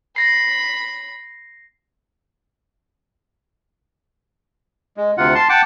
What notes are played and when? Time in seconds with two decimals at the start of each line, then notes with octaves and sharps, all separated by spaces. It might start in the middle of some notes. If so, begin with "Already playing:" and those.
0.16 B5 A#6 C7
4.97 G#3
5.17 D2 C3 F4 F#5
5.35 A5 C6
5.49 F#5 G5 A5 D6